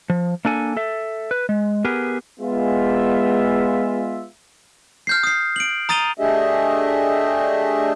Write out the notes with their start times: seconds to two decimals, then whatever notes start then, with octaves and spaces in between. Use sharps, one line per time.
0.10 F3
0.45 A#3 D4 A4 G#5
0.77 A4 E5
1.31 B4
1.49 G#3
1.85 B3 G4 G#4 A#4 B4
2.40 G#3 B3 F4 E5
5.07 F6 G6 C7
5.23 D#6 C7
5.56 D7 F#7
5.89 A#5 D#6 A6 D#7 F7 G7
6.19 A3 D4 G4 G#4 D#5 E5